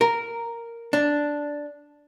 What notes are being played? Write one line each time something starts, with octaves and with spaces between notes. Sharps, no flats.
A#4
D4